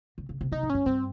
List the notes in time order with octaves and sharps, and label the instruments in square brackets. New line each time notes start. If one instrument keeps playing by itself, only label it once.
[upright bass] C#3
C#3
C3
[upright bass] C3 [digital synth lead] D#4
[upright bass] G#2
[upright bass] G2 [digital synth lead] C#4
[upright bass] G2 [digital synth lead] C4